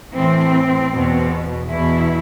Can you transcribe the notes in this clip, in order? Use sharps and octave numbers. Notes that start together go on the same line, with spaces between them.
A2 E3 C4
E2 B2
E2 B2 E4